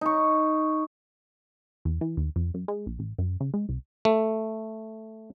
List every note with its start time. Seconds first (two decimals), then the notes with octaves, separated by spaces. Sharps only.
0.01 D#4 C#6
1.85 E2
2.01 E3
2.17 D#2
2.36 F2
2.54 F#2
2.68 G#3
2.86 A#1
2.99 A1
3.18 F#2
3.40 C#3
3.54 G#3
3.69 C2
4.05 A3